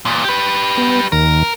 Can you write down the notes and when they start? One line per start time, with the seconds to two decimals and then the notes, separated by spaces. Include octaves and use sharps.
0.05 E2 A#2
0.25 G4 B4
0.78 B3
1.12 D#2 A#4